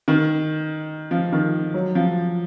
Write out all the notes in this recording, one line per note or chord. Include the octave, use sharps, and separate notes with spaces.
D#3
F3
D#3
F#3
F3